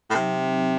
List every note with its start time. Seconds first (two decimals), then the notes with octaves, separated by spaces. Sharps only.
0.10 A2
0.15 C3 F#3 C4 D#4